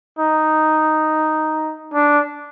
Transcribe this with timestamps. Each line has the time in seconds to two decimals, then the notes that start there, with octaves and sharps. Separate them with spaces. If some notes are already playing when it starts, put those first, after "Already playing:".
0.19 D#4
1.94 D4